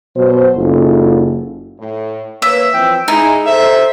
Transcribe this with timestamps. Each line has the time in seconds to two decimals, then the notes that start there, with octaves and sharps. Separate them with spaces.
0.16 B2 F#3 C5
0.56 F#1 D#4 F4 A4
1.79 A2
2.42 A#3 B4 C#5 E5
2.74 E3 F3 C4 G5
3.08 G#3 D#4 E4
3.46 A4 C5 E5